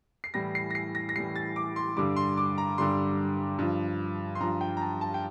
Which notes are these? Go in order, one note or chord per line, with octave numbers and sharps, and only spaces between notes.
C7
A2 E3 G3 A#6
C7
A#6
C7
A#6
A#6
A2 E3 G3 C7
A6
D6
C6
G2 D3 G3 D6
C6
D6
A#5
G2 D3 G3 C6
G2 F3
C6
G2 F3 A#5
G5
A#5
A5
A5
G5